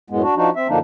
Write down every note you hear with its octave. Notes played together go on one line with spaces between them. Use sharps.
F#2 A2 G#3 B3
D4 F#4
F3 D4 D#4 F#4
C4 E5
F#2 D3 F3 A#3 D4 D#4